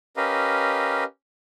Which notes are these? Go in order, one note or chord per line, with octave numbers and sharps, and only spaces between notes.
C#4 G4 A#4 B4 D#5 F5